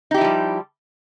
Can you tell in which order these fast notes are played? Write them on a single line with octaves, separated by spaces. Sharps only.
D#4 G4 E4 F3 G3